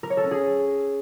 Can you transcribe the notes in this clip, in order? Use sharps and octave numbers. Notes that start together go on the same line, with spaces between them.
A#4
C#5
A4
C#4
G#4